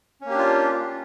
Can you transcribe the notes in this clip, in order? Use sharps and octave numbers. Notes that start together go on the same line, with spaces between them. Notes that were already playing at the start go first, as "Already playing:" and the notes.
A#3 C#4 D4 F4 G4